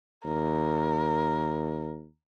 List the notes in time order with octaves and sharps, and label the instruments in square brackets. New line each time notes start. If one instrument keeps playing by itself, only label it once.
[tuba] D#2 [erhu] A#4